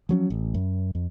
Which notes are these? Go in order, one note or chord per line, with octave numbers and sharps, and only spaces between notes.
F3 F#3 C4 C#4
A1
F#2
F2